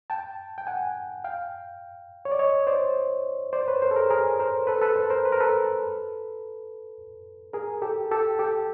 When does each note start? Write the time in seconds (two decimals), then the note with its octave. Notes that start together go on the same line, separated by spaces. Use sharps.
0.10 G5 A5
0.58 G5
0.67 F#5 G#5
1.24 F5 G5
2.25 C#5
2.32 D5
2.39 C#5 D#5
2.67 C5 D5
3.53 C5 D5
3.68 B4 C#5
3.82 A#4 C5
3.91 A4
3.96 G#4 A#4
4.10 G#4 A#4
4.39 A#4 C5
4.67 A4 B4
4.81 A4 B4
4.96 A#4 C5
5.10 A#4 C5
5.25 B4
5.32 A#4
5.40 A4 B4
7.53 G#4 A#4
7.82 G4 A4
8.11 G4 A4
8.39 G4 A4